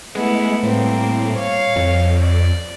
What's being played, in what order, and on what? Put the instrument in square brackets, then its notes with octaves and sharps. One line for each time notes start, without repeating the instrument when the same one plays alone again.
[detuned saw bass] G#3 [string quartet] A3 B3 E4
[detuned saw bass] A2 [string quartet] G3 A#3 C4
[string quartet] C#5 F5
[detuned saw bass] F2
[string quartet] D5